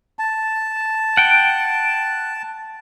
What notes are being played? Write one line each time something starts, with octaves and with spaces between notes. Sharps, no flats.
A5
F#5 G5